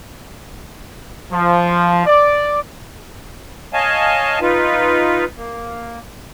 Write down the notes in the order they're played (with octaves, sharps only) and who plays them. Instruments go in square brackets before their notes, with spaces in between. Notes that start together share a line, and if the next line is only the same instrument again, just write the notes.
[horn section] F3
D5
[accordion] C#5 D#5 F5 G#5 A5
D#4 F4 B4
A#3